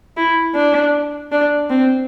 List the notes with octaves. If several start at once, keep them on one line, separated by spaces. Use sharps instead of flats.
E4
D4
D4
C4